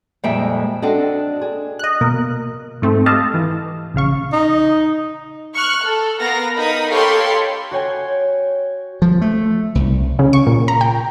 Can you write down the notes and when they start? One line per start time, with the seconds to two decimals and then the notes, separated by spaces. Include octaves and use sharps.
0.24 F2 A#2 G3 G#3 E5 G5
0.82 C4 D4 F#4 A4 D5 D#5
1.41 G#4
1.79 D#5 F#6
2.01 B2 A#3 A#4
2.82 G#2 A3 C4
3.06 G4 A4 D#5 F5 A5
3.34 E3
3.94 A#1 C#3 F5 C#6
4.33 D#4
5.54 C#6 F6 F#6
5.84 A4
6.20 B3 A#4 F5 A#6
6.55 D#4 A#4 B5 D#6
6.90 G4 A4 C#5 F5 B5 C6
7.71 F#4 C#5 G5 G#5
9.02 F3
9.21 A3
9.75 C2
10.19 C#3
10.33 C#6
10.47 A#2
10.68 A#5
10.81 G5